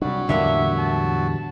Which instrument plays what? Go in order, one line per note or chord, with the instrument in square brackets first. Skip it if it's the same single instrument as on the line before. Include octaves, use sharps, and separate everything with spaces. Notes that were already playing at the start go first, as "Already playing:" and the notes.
[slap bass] C3 D4 [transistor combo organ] F#3 [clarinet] G3
[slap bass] E2 A2 B3 [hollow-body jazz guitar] D3 G3 A#3 [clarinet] E5
[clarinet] A5